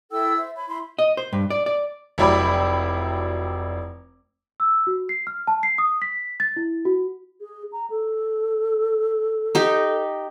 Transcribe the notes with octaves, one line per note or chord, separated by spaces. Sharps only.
E4 A4 G5 E6
C5 E5
C#5 B5
E4 B5 C6
D#5
C5
G2
D5
D5
F1 F#3 E4 D5 G5 B5
E6
F#4
C7
F6
A5
C7
D#6
B6
A6
E4
F#4
G#4
A#5
A4
D#4 G4